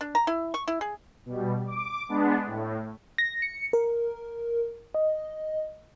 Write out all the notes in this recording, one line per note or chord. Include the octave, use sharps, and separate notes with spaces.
D4
A#5
E4
C#6
E4
G#4
B2 G3
D6
G#3 B3 D4
A2
A#6
C#7
A#4
D#5